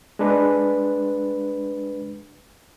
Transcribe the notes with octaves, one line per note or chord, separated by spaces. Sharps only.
G#3 D4 B4